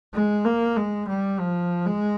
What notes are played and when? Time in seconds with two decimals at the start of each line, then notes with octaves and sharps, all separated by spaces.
0.14 G#3
0.45 A#3
0.77 G#3
1.08 G3
1.39 F3
1.86 G#3